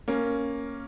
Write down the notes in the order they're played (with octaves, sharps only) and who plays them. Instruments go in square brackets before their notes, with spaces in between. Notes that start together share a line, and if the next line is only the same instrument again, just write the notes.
[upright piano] A#3 C#4